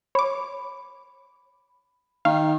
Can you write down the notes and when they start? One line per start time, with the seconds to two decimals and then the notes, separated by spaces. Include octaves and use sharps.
0.15 C#5 B5 D6
2.25 D#3 F5